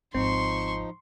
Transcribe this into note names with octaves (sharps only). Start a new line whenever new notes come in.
G#1 D#2 F3 C4 D#4 C6 C#6